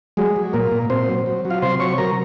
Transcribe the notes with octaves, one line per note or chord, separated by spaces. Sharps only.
F#3 G#3 G#4
F#3
A#2 A#3 A#4
A#2
A#2 C4 C5
F#3
F#3
F#3
F4 F5
C3 C5 C6
F#3 C#5 C#6
F#3 A#4 A#5